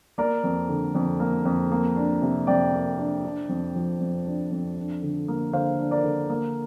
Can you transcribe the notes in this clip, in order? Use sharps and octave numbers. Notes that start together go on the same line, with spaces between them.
A#3 A#4 D5
F2
D3
F2
A#3
F2
A#3
D4
C3
F2 D5 G5
A#3
D4
D4
F2
F3
F2
D4
F2
D4
D3
A#3
D3 C5 F5
D4
A#4 D5
D3
A#3